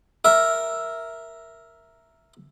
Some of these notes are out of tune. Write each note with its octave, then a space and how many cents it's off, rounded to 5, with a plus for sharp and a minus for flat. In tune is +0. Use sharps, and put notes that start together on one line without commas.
A#4 +0 E5 +0